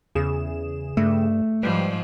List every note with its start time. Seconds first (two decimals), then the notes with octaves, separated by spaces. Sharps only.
0.15 E2 C#3 G#4 E7
0.97 G2 A3
1.63 G#2 F3 G3 B4